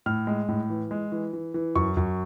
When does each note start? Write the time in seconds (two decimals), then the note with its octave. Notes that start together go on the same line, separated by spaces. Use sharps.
0.06 A2 F6
0.27 G#3
0.48 A2
0.70 E3
0.91 G#3
1.12 E3
1.33 E3
1.54 E3
1.76 F#2 C#6
1.97 F#2